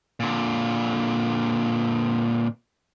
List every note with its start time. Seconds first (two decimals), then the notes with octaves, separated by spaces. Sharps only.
0.20 A#2 D3